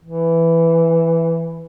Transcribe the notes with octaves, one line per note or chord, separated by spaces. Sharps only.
E3